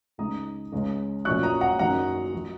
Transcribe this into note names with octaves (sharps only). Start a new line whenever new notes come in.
C#2 C#3 G#3 D#4 A#5 D#6
C#2 C#3 G#3 C#4
A#1 A#2 F#3 C#4 C#6 F#6
A#5 D#6
F#5 A#5
F#1 F#2 D#3 F#3 C#4 F#5 A#5
F#3